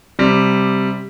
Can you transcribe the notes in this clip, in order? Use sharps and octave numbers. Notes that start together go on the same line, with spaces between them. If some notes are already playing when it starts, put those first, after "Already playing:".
C3 G3